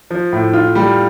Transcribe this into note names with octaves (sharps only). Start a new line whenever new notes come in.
F3
A2
F4
G3